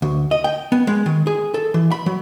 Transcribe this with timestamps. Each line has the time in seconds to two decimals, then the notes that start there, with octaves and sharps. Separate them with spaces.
0.02 D2
0.31 D#5
0.44 G5
0.72 B3
0.87 G#3
1.06 D#3
1.27 G#4
1.54 A4
1.74 E3
1.91 B5
2.06 F#3